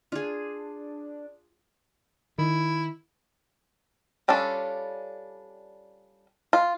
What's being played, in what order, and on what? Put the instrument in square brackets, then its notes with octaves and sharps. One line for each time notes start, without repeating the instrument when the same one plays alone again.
[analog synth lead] D4 [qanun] F4 G#4
[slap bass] D#3 [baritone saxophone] E4
[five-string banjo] G3 C#4 D4 F4 A4
F4